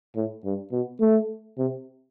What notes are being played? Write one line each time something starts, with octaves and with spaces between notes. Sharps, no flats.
A2
G2
B2
A3
C3